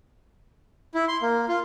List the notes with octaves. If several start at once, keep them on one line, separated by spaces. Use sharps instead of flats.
E4
C6
A#3
F4